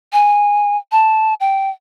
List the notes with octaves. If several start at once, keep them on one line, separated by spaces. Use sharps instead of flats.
G#5
A5
G5